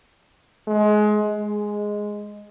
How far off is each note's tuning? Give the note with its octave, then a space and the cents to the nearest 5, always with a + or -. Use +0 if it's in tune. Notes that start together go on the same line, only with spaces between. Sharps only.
G#3 +25
G#3 +0